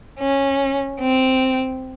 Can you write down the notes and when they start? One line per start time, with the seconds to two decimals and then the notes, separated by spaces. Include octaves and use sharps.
0.20 C#4
1.01 C4